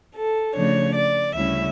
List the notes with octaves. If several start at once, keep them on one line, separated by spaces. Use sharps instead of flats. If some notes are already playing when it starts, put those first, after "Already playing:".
A4
C#3 F3 A3 D4 C#5
D5
D2 C#3 G3 C#4 E4 E5